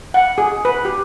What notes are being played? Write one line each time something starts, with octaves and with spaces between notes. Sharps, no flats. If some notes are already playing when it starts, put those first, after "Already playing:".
F#5
G#4
B4
G4